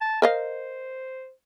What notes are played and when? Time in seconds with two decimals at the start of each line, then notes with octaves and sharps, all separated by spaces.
0.01 A5
0.22 A#4 C5 D#5 F5